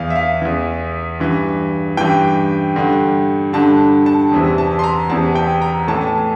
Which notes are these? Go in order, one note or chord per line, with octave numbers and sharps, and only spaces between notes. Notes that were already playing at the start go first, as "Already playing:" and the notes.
Already playing: E2 E3 F5
E5
F5
E2 E3
G2 E3
G2 E3 G5
G2 D3
G2 D3 A5
A5
E2 C3 E3
A5
C6
A#5
E2 C3 E3 A5
G5
A#5
A2 E3 A5
A5